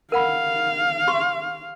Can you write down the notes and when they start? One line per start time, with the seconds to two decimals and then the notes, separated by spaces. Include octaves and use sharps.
0.12 A#4 F5 F#5 B5
1.08 G4 C6 C#6